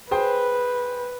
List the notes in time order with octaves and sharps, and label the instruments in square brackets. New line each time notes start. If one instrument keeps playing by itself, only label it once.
[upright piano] G#4 C5 G5 [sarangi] B4